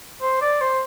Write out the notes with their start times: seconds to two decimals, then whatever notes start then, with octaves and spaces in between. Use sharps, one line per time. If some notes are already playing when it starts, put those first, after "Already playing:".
0.22 C5
0.41 D5
0.61 C5